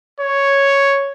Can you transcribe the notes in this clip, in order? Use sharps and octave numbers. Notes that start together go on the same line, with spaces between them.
C#5